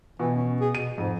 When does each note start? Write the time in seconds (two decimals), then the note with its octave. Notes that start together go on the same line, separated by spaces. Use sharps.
0.19 B2 E3
0.36 C#4
0.61 G#4
0.75 B2 D#7
0.98 F2 G#2